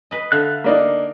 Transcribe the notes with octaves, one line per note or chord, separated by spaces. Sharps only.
B4 D#5
D3 E5 F5 F#6
A#3 D4 D#4